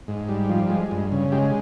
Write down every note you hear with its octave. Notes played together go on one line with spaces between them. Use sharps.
G#2
G3
F3
G#3
G2
C#3
G#3 G4